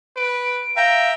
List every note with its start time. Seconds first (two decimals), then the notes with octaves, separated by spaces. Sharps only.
0.16 B4 D7
0.77 E5 F5 G5 A#5